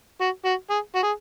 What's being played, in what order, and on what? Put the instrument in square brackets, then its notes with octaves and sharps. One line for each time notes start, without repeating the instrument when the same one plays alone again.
[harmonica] F#4
F#4
G#4
F#4
G#4